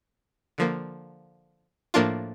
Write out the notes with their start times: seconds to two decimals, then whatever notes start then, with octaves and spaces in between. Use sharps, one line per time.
0.58 D3 F3 A#3
1.94 A2 F3 A#3 D4 F4